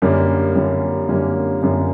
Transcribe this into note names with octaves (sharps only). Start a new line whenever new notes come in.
F#2 D3 G3 A#3 C#4
F#2 D3 G3 A#3 C#4
F#2 D3 G3 A#3 C#4
F#2 D3 G3 A#3 C#4